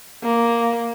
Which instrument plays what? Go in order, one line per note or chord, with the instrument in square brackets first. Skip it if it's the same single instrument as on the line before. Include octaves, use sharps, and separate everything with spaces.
[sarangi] A#3